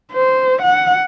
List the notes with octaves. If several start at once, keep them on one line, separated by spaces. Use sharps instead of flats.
C5
F#5